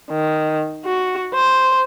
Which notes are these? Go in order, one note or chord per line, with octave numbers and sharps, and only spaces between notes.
D#3
F#4
C5